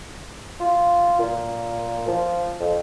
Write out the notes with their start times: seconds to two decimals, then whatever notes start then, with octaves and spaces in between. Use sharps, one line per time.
0.60 F4
1.19 A#2
2.08 F3
2.60 F2